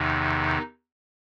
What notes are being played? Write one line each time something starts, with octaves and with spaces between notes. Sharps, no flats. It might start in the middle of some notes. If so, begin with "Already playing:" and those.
Already playing: E2 C3 D#3 D#4